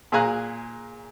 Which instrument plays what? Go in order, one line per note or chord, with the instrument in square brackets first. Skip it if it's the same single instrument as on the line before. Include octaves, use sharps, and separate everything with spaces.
[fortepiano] A#2 G#4 F5 G#5 A#5 F#6